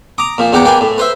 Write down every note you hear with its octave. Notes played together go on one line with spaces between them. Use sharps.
A#5 D6 D#6
A#2 F3
E2 D#4 G4 F#5 D6
A#3 B4 D5 G5 G#5
A2
B4 C5 E5